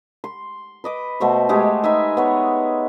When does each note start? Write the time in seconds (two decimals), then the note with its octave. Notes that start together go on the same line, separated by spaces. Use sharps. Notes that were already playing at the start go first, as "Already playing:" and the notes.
0.24 C6
0.84 B4 D#5 D6
1.20 B2 A3 C5 C#6
1.49 G#3 A3 G4 G#4
1.84 D#4 B4 E5 G#5
2.17 B3 C#5